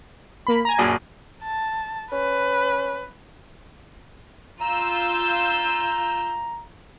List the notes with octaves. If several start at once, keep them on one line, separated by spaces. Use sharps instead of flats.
A#3 B5
G#5 A#5
A#1 F#2
A5
C#4 B4
F4 A#5 E6 G6